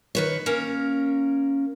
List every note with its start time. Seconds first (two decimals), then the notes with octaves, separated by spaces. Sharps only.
0.15 D#3 B4 C#5
0.46 A#3 C#4 A#4